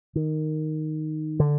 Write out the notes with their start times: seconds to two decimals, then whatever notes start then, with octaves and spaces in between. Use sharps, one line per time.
0.15 D#3
1.40 D3